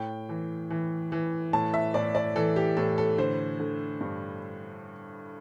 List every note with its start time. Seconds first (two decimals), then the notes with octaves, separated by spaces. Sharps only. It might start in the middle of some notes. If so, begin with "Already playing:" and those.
Already playing: A2 G5
0.29 E3
0.70 E3
1.12 E3
1.53 A2 A5
1.74 E5
1.94 A2 D5
2.15 D5
2.36 E3 A4
2.56 G4
2.77 A2 A4
2.98 A4
3.18 D3 C5
3.60 D3
4.01 G2